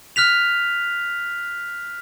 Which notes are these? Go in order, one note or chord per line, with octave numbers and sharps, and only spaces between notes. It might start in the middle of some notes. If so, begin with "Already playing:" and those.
F6 F#6 B6 F7